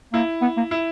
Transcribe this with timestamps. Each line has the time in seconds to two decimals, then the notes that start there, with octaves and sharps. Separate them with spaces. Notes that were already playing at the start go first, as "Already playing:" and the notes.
0.13 A#3 E4
0.42 B3
0.57 A#3
0.71 E4